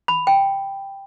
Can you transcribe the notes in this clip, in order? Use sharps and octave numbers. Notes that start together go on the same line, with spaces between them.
B5
G5